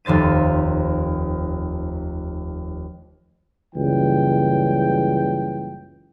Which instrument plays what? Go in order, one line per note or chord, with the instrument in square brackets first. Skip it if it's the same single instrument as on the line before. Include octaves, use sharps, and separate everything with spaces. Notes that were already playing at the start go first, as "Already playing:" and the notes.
[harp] F1 D#2 C5 A6 D#7
[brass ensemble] F#1 C#2 E3 G3 G5